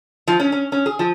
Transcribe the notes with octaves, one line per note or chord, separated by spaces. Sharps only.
F3
C#4
C#4
C#4
G#4
F3